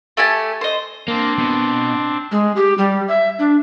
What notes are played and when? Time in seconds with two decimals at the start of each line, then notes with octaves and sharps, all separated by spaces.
0.17 A3 G4 G#5 A5
0.61 C5 D#5
1.08 A#3 C4 D4
1.39 B2
2.32 G#3
2.56 G4
2.78 G3
3.08 E5
3.39 D4